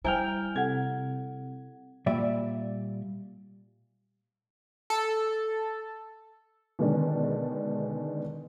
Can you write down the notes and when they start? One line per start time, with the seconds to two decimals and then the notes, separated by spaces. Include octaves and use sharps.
0.04 G3 E4 C5 G5 G#5 A#5 F6
0.56 C3 A4 F#5 G#6
2.06 A#2 G3 D5 E5 B5
4.90 A4
6.79 B2 D3 D#3 G#3 C#4 D4